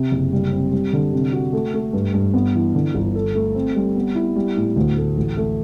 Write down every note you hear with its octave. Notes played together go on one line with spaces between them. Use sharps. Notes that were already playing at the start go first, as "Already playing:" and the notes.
Already playing: C3
F#1
G3
C4
G3
D3
C3
F#4
A3
A3
G2
G2
B3
E3
D3
G1
A4
A3
C4
G3
B3
E4
G3
A2
D2
A3
A1
A3